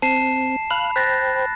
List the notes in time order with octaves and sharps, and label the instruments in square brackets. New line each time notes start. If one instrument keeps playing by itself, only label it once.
[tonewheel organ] C4 [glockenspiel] A5 C7 E7
[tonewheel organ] F5 F#6 [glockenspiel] B5
[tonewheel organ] C5 G5 B5 [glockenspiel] F#6 A6 A#6